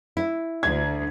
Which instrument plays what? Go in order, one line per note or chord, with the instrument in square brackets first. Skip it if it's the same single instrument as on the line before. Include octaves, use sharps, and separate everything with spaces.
[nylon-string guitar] E4
[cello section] D2 [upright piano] G#6